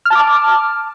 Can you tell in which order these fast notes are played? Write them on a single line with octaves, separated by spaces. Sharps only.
F6 A5 D6